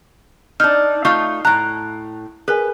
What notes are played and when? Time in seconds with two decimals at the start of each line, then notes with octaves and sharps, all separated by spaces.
0.60 D4 D#4 F6
1.05 A3 D#4 F4 C#6
1.45 A2 A#5 F#6
2.48 G#4 A#4 B4 G#5